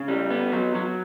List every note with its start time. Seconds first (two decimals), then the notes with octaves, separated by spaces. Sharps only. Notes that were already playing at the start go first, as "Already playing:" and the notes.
Already playing: C#3
0.08 G3
0.30 B3
0.52 F#3
0.75 F#3